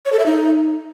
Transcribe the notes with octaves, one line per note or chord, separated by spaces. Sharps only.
C#5
A4
E5
D#4